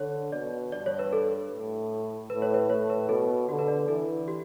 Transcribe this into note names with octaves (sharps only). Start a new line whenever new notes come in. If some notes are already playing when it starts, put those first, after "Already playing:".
Already playing: D3 C#5
B2 D5
G2 D5
C#5
B4
A4
A2
A2 B4
C#5
B4
A2 C#5
B4
B2 A4
D3 G4
B4
D5
E3 A4
G4